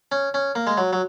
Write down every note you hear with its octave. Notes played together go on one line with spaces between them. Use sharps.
C#4
C#4
A#3
G#3
F#3
F#3